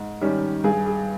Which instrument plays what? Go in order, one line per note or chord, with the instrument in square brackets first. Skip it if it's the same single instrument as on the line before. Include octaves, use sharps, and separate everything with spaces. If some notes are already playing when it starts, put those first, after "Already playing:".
Already playing: [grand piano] G#2
D#3 G3 C#4
G2 G#4
G#4